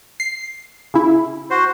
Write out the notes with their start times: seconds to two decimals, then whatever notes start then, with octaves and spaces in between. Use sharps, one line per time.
0.20 C7
0.94 C#3 E4
1.50 F#4 C5